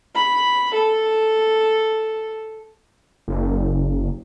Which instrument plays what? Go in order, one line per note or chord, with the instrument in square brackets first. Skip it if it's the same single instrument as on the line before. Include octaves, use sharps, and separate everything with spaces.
[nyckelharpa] B5
A4
[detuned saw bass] F#1